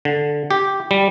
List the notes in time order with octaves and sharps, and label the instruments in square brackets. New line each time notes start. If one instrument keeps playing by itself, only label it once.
[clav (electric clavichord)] D3
G4
G3